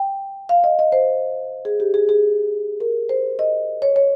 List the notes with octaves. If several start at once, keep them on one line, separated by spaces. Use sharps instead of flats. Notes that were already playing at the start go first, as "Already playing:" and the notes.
Already playing: G5
F5
D#5
D#5
C5
G#4
G4
G#4
G#4
A#4
C5
D#5
C#5
C#5